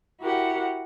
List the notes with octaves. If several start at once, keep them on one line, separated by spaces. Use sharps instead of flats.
E4 F#4 G4 A#4 F#5